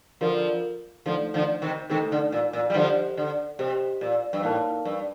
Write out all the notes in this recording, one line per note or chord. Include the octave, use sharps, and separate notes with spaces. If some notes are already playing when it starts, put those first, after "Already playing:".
D3 F3 F4 A#4 F5
D3 F3 A3 D#4 A4
D3 F3
C3 D#3
C3 D#3 A3 D#4 A4
D3
A#2
A#2
G3
D3 F3 G4 C5 D#5
D3
C3 G4 C5 D#5
A#2
G2
A2 A#3 D#4 A#4 F5 A5
G2